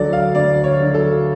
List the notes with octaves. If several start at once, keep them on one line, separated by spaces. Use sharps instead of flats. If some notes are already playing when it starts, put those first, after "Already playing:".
Already playing: D2 D3 F#3 A4 D5
F5
D2 D5
C#5
D3 F#3
A4